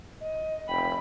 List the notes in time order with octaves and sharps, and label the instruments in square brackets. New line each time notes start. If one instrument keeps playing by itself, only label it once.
[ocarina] D#5
[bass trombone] F1 [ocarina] G5 [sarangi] B5